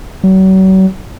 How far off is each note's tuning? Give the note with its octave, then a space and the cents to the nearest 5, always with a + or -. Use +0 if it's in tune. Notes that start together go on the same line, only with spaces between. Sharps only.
F#3 +40